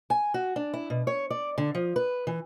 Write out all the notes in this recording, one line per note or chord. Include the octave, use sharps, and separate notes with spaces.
G#5
F#4
D4
E4
B2
C#5
D5
D3
F3
B4
E3